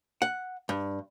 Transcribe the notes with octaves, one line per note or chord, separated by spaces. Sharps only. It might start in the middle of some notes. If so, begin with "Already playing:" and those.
F#5
G2